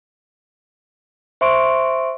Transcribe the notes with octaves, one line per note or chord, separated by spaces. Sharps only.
C5 E5 C6 C#6 D7